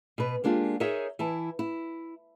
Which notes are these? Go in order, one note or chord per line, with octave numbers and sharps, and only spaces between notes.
B2 B4
G#3 A#3 D4 F4 G4
D#4 G#4 A#4 C#5 E5
E3 E4 A5
E4